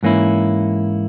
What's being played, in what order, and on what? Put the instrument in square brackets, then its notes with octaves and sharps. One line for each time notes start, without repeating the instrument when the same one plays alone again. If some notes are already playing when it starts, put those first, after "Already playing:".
[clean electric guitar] G#2 E3 A#3 C#4 E4